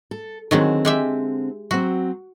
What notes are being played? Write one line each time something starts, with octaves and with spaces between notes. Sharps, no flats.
A4
D3 D#3 F#3 G#3 C4
G#3 G4 E5
F#3 C4 F#4